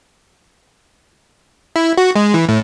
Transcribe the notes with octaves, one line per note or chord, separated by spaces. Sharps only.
E4
F#4
G#3
E3
A2